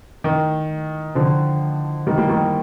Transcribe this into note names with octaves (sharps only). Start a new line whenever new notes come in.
D#3
D3 F3
D#3 G3
G3 A#3
D#3 G3